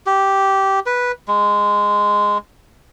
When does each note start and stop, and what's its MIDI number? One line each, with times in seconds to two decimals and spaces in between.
0.06 0.80 67
0.86 1.12 71
1.28 2.38 56